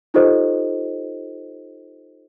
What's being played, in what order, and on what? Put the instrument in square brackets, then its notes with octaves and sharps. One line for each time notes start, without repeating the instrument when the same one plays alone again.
[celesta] D#4 F4 G4 A4 C5 D#5